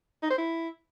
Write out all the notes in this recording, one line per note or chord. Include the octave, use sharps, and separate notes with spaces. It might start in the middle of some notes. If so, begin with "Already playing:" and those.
D#4
C5
E4